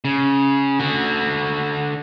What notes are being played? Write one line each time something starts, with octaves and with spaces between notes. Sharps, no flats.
C#3
D3 F#4